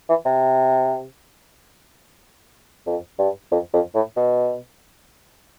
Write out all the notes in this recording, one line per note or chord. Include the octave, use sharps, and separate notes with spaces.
E3
C3
F2
G2
F2
F2
A2
B2